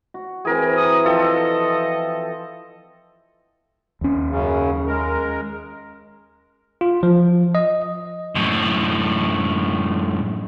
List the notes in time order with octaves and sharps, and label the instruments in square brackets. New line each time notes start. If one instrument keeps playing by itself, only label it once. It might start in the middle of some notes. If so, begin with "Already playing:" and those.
[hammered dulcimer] F#4
[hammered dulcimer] E3 C4 [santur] G#4 A#4 G#5
[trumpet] D#6
[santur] F3 A4 G5 [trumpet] D#5 [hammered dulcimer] E5 G#5
[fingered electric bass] D#2 C#4
[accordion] F#2 C#3
G#3 A#4
[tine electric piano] F4
F3
D#5
[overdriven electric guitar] F#2 A2